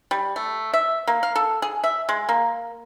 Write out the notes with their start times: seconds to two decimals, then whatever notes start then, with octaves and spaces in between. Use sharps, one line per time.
0.11 G3
0.36 A3
0.73 E5
1.07 A#3
1.23 F5
1.36 A4
1.62 G#4
1.84 E5
2.09 G#3
2.29 A#3